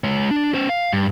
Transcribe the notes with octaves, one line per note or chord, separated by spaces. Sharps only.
G#3 C#5
D4
C#4 C5
F5
G2